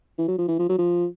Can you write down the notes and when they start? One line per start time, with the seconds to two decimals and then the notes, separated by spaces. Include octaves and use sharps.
0.18 E3
0.28 F#3
0.38 F3
0.48 E3
0.59 F3
0.69 F#3
0.78 F3